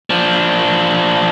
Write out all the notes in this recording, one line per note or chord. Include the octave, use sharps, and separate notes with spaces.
F3 D4